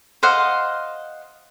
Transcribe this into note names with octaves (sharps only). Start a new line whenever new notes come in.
C5 D#5 F5 F#5